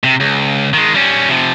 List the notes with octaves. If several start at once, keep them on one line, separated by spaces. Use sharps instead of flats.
C3
C#2
D#3 G#3
G3 C#4
C3 F3